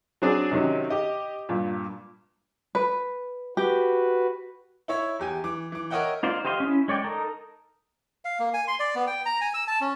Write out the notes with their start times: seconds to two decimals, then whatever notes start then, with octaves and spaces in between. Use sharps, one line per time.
0.22 F#3 C4 D4 G#4 D5
0.51 C3 D#3 F#3 C#4 D#4
0.90 G4 D#5
1.49 G2 A#2
2.75 B4
3.57 F#4 G4 B4
4.88 E4 C#5 E5
5.19 E2 G4 G#5
5.44 E3 D6
5.72 E3 D6
5.90 A#4 C#5 D#5 E5 F#5 G5
6.23 D#4 F4 C5 D5
6.45 G4 C5 D#5 F5 C6
6.60 C#4 E4
6.88 G#3 C#5 D5 G5
7.04 D#4 A4 A#4
8.25 F5
8.39 A#3
8.54 G#5
8.68 C6
8.80 D5
8.95 B3
9.07 G5
9.25 A#5
9.41 G#5
9.54 E6
9.68 A5
9.81 C#4